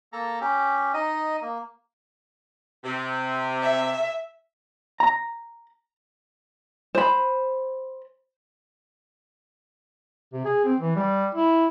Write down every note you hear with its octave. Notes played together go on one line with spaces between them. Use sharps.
A#3 A4 A5 A#5
C#4 G4
D#4 D#5
A#3
C3
E5
A#5
C5 B5
C3
G#4
C4
E3
G3
E4